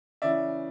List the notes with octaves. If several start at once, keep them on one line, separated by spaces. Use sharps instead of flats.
C#3 E3 D5 E5